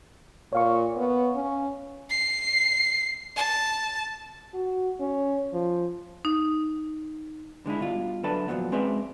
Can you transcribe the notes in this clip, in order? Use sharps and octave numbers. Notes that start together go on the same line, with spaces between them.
A#2 C#5 F5 C#6
B3
C#4
C7
A5
F#4
C#4
F3
D#4
D3 G#3 D#4 E4
G2 B2 F4
D3 F#3 A4 B4 E5 A5
A#2 D#3 F3 F#3 B3
G#3 C4 C#4 B4 D5 E5